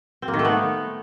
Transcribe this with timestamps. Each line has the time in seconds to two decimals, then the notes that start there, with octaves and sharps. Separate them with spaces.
0.22 C4
0.28 A#3
0.34 D#3
0.39 A3
0.45 B3